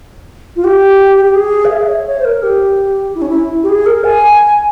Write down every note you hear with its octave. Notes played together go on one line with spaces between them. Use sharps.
F4
G4
G4
G#4
F5
E5
C#5
C#5
C5
A#4
G4
E4
C#4
E4
G4
G#4
A#4
G#5